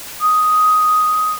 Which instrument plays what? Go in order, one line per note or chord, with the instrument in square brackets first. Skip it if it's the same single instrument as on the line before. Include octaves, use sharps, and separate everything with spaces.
[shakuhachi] D#6